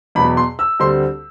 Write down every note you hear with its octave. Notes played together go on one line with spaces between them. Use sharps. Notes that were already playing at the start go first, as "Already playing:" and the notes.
E2 B2 F#3 B5
C6
E6
D2 D3 G3 C4 C6